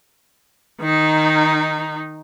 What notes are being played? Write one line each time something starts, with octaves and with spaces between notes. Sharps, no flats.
D#3 D#4